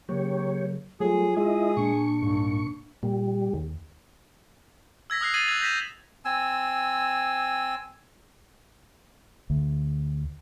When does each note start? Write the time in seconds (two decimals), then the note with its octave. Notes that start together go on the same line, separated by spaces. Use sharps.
0.09 C#3 F#3 A#3 G4 C#5
1.00 F#3 G3 A3 F4 G#4
1.37 G#3 E4 G#4 D#5
1.77 A#2 D4 C#6
2.22 C2 G#2
3.03 A#2 G3
3.54 D#2
5.10 E6 G#6 A#6 B6
5.21 D#6 F6 F#6 C7
5.34 D#6 G#6 A6 C7 D#7 F#7
5.47 E6 F#6 G#6 A#6 F7 F#7
5.61 G6 A#6 B6 D#7 E7
6.25 C4 G#5 E6
9.50 D2